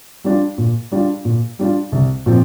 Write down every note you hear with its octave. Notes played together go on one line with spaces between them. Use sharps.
G3 D4 F4
A#2
G3 D4 F4
A#2
G3 D4 F4
C2
A#2 F3 C4